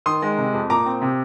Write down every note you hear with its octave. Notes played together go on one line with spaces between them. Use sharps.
D#3 C6 D#6
G#3
C3
F2
A#2 A#5 D6
C4
C3